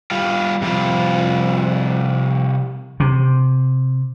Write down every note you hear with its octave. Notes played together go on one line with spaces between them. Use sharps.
G3 F4
C3 F3 G3 F4
C3